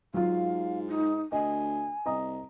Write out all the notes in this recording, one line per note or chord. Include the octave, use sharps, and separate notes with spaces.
G#2 F#3 F4 F5
D#4
D2 D#5 G#5
C2 D#5 A#5 D#6